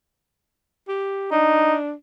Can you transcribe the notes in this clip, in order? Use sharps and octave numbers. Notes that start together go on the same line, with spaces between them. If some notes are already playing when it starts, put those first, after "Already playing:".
G4
D4 D#4